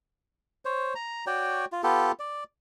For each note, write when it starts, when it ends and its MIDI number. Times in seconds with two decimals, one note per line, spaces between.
0.65 0.94 72
0.65 0.94 73
0.95 1.25 82
1.27 1.65 66
1.27 1.65 73
1.27 1.65 74
1.27 1.65 79
1.72 1.82 65
1.83 2.12 59
1.83 2.12 65
1.83 2.12 67
1.83 2.12 69
2.19 2.44 74